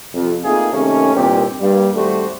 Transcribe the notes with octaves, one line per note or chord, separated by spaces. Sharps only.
F2 C3
A3 A#3 C4 D#4 F4 G#4
C3 D#3 A3 A#3 C#4
C2 G2 A#2 D#3 C4 G4
G2 G3 A#3
G#1 G3 A3 F#4 C5